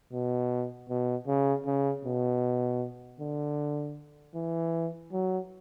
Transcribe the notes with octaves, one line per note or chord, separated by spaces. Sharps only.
B2
B2
C#3
C#3
B2
D3
E3
F#3